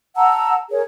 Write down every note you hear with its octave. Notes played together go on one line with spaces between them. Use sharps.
F#5 A5 A#5 E6
G#4 A#4 C#5